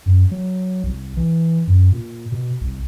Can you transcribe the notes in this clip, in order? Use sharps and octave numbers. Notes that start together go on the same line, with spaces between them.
F#2
F#3
C2
E3
F#2
A#2
B2
C2